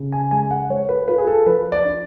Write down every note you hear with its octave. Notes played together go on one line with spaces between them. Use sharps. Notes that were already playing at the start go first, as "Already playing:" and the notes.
Already playing: C#3
G#5
G#3 G#5
F#5
G#3 C#5
B4
F4 B4
G#4
A4
F3 B4
D5
D4